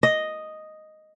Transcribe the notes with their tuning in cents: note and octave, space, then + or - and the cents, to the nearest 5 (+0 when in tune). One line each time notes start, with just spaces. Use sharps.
D#5 +0